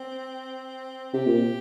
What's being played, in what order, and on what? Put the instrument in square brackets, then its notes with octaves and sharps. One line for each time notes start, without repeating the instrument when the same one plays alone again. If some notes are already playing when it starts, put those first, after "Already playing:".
Already playing: [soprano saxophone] C4
[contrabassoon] C3 [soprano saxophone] G4
[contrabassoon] A#2